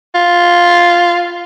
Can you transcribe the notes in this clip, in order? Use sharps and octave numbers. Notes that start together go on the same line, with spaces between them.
F4